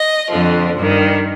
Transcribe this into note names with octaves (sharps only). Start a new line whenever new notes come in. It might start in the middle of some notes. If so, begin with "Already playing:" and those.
Already playing: D#5
F2 D3 F3
G2 D#3